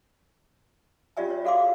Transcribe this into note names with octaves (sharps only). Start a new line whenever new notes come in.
C#4 F4 G4 D5 E5 G#5
C#5
F#4 A4 F5 C6 D6
G#4